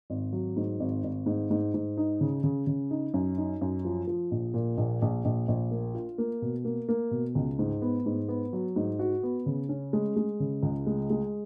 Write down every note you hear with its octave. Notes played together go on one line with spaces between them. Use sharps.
G#1
F#3
G#2
G#1
G#1
G#2
G#2
G#2
D#4
C#3
C#3
C#3
D#4
F#2
D#4
F#2
F3
F3
A#1
A#2
A#1
A#1
A#1
A#1
A#3
F4
A#3
B2
A#3
A#3
B2
C#2
G#2
B3
G#2
B3
F#3
G#2
F#4
B3
C#3
C#4
G#3
G#3
C#3
C#2
G#3
G#3